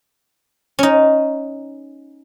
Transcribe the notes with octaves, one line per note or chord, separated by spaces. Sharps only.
C#4 D#4